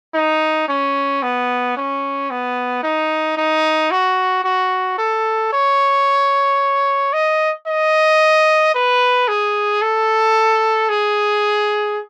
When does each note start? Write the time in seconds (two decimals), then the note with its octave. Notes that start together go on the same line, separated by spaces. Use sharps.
0.15 D#4
0.68 C#4
1.23 B3
1.77 C#4
2.30 B3
2.83 D#4
3.37 D#4
3.91 F#4
4.44 F#4
4.98 A4
5.53 C#5
7.13 D#5
7.67 D#5
8.75 B4
9.28 G#4
9.82 A4
10.89 G#4